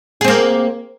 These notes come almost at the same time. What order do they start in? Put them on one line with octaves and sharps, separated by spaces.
G#4 C4 A#3